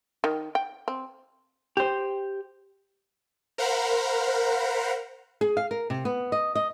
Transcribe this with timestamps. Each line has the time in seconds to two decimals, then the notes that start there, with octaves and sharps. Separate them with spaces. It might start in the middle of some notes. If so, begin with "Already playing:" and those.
0.24 D#3
0.55 G5
0.88 C4
1.77 G4 C5
3.58 A#4 C5 F5 F#5 A#5 B5
5.41 G#4
5.57 F5
5.71 A#4
5.90 C3
6.05 B3
6.32 D#5
6.55 D#5